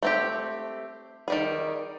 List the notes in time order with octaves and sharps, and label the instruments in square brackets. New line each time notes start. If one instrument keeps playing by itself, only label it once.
[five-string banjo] A3 C4 G4
D#3 G3 G#4